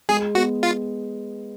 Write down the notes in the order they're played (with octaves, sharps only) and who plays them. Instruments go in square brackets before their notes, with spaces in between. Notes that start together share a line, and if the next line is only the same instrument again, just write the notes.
[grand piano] G#3 [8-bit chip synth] G#4
[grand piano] B3 [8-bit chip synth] F#4
[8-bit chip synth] F4